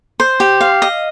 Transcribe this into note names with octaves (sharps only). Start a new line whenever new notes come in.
C5
G4
F5
D#5